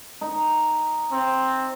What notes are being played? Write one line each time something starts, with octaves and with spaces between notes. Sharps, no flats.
D#4
C4